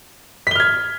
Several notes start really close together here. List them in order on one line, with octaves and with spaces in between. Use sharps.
B6 G7 F6 G#6